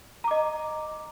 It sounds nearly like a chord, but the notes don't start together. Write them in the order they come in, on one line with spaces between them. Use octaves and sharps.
A#5 D6 D#5